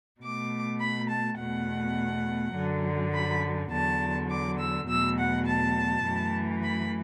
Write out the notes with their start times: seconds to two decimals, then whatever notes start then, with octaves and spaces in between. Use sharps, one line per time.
0.22 B2 A3 D6
0.80 B5
1.09 A5
1.39 E2 B2 A3 F#5
2.55 F#2 D3 F#3
3.14 B5
3.72 E2 D3 F#3 A5
4.30 D6
4.59 E6
4.88 E2 B2 F#3 A3 E6
5.18 F#5
5.47 A5
6.05 F#2 E3 A3
6.64 B5